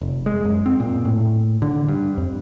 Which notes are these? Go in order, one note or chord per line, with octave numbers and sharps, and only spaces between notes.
F1
G#3
F#2
C4
A#2
A2
D3
G2
F2